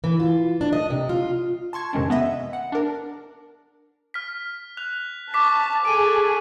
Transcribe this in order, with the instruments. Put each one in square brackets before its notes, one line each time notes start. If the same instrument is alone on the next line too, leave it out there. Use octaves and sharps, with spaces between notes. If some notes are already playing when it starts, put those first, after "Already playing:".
[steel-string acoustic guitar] E3
F4
D4
D#5
C3
F4
[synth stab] A5 C6 C#6 G#6
F2 C3 D#3 G#3 C#4 D4
B3 D#5 E5
F#5
D4 A#4
[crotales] F6 B6
F#6 F7
[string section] A5 [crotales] C#6 D6 B6
[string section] G#4 A4 [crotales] D7 D#7